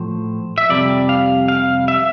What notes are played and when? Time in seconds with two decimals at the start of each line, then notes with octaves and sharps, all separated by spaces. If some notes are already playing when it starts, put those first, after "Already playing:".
Already playing: A2 F3 C5
0.58 E5
0.70 F2 C3 G3 D5
1.09 F5
1.48 F5
1.88 E5